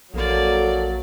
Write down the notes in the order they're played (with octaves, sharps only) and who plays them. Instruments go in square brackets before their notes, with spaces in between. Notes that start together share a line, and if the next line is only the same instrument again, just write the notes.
[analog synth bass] A#1 [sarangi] F#3 [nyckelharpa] A#3 D5 [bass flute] A4